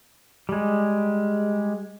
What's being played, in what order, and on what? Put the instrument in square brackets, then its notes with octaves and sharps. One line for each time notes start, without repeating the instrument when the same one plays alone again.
[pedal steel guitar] G3 G#3